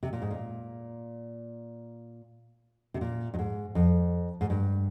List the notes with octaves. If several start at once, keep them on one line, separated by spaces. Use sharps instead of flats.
C3
A#2
G#2
A#2
C3
A#2
G2
G#2
F2
G#2
G2